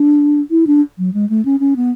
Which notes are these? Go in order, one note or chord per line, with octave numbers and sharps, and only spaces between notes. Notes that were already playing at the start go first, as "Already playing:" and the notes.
Already playing: D4
E4
D4
F#3
G#3
A3
C#4
C#4
B3